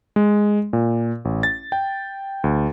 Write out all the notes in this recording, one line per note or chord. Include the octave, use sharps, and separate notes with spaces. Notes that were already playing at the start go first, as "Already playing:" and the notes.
G#3
A#2
A1
A6
G5
D2